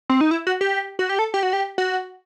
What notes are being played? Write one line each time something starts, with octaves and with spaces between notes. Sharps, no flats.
C4
D#4
E4
F#4
G4
F#4
G4
A4
G4
F#4
G4
F#4